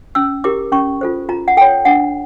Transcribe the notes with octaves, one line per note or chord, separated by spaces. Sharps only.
C#4 E6
E4 G4 A#4 D6
C#4 C#6
F4 A4 C5
F4 A#5
F#5
A4 C#5 G5
D4 F#5